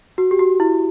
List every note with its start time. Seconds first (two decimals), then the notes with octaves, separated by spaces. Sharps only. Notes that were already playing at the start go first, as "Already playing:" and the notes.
0.18 F#4
0.31 G4
0.39 F#4
0.60 E4